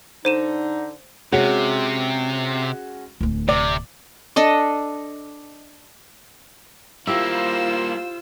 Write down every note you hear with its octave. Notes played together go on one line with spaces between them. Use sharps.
D3 D#4 C5 D#7 E7
C3 G#3 C#4 F#4
D1 D2
C3 D5
D4 A4 D#5
G3 A#3 E4 F4 G4 C5 E6